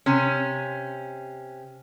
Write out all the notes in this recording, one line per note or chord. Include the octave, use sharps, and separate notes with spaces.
C3 C#4